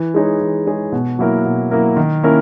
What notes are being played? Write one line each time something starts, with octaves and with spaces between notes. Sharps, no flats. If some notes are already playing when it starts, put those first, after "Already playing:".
Already playing: E3
G#3 D#4 G#4 C#5
E3
G#3 D#4 G#4 C#5
B2
F#3 A#3 E4 A#4
B2
F#3 A#3 E4 A#4
D#3
A#3 C#4 E4 A#4